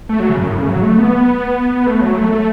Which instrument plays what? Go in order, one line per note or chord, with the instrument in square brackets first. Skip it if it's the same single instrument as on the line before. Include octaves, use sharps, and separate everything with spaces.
[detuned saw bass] A3
F#3
C#3
F#2
A2
C#3
F#3
A3
B3
A3
F#3
A3
A3